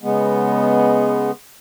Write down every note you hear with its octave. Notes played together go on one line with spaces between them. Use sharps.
C#3 G#3 B3